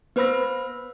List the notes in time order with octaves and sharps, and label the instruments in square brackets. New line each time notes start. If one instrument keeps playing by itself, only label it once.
[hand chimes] B3 B4 C5 B5 E6 A#6